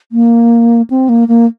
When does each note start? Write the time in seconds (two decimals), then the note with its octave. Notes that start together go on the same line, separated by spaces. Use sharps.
0.12 A#3
0.90 C4
1.09 A#3
1.28 A#3